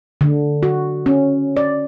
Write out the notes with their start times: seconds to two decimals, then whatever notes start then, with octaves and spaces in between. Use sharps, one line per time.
0.21 D3
0.63 F#4
1.06 C#4
1.57 D5